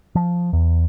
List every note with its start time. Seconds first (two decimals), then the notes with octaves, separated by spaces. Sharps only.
0.15 F3
0.53 E2